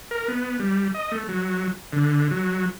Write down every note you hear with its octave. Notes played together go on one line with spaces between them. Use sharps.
A#4
B3
G3
D#5
A3
F#3
D3
F#3